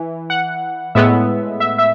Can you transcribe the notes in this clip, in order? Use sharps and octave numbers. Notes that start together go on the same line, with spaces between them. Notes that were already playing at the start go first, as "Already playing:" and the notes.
Already playing: E3
F#5
A2 G#3 B3 E5
E5
E5